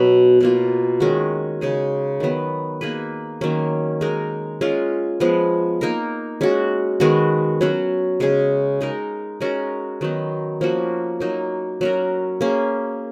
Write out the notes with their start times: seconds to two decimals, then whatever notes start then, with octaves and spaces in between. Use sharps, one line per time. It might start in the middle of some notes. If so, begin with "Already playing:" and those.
Already playing: B2 F#3 B3
0.40 B2 A#3 F4
1.00 D#3 G#3 C#4 F#4
1.61 C#3 G#3 D#4 G#4
2.20 D#3 F#3 B3
2.81 A#3 D#4 G#4 B4
3.41 D#3 F#3 A#3 C#4
4.01 G#3 D#4 A#4
4.61 G#3 C#4 F4
5.20 F3 G#3 B3
5.81 A#3 D#4 A#4
6.41 G#3 C#4 F#4
7.00 D#3 G#3 B3 F#4
7.61 F#3 C#4 F#4
8.20 C#3 G#3 C#4 G#4
8.81 G#3 D#4 A#4
9.41 G#3 C#4 F#4 A#4
10.01 D#3 F#3 B3 D#4
10.61 F3 A#3 C#4 F#4
11.20 F#3 A#3 D#4
11.81 F#3 C#4 F#4 A#4
12.41 A#3 C#4 G#4